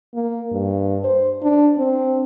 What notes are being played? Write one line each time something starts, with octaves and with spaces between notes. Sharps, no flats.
A#3
G2
C5
D4
C4